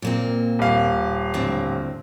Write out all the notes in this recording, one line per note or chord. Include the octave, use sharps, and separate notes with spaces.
A#2 A#3 C4
D#1 F5
D2 A2 C4